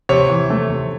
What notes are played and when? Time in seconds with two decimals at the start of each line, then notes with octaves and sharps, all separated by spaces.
0.09 C3 C#5
0.30 E3
0.50 A3
0.70 C3